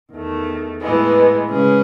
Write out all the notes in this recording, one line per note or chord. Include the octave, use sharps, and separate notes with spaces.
E2 D#3 A3
A2 E3 G#3 B3
C#3 G#3 C#4 G#4 B4